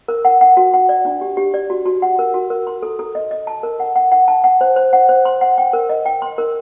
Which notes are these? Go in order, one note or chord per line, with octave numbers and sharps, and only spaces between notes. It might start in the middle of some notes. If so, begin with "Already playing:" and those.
A#4
F#5
F#5
F#4
F#5
D5
D4
G4
G4
D5
F#4
F#4
F#5
A#4
F#4
A#4
C6
A4
A4
D#5
D#5
A5
A#4
F#5
F#5
F#5
A5
F#5
C5
C5
F#5
C5
C6
F#5
G5
A#4
D#5
G5
C6
A#4